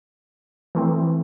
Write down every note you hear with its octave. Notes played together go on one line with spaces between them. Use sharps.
E3 A3 C4